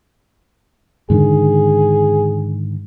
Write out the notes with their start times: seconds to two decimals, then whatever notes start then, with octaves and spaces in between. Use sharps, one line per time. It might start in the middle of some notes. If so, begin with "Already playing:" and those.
1.10 G#2 D3 D#3 G#4